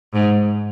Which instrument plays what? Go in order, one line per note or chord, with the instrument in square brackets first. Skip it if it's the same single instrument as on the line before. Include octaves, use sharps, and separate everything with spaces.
[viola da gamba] G#2